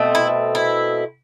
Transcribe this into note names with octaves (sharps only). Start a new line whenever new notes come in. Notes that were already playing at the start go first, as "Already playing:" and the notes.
Already playing: B2 A3 C4
E4
E4